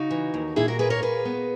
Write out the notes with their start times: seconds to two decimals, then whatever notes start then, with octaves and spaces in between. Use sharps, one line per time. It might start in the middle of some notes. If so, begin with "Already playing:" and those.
Already playing: C#3 D#4 F#4
0.11 E3
0.34 D#2
0.56 A#2 E4 G#4
0.68 F#4 A#4
0.79 A#3 G#4 B4
0.90 A#4 C#5
1.02 A#2 G#4 B4
1.25 B3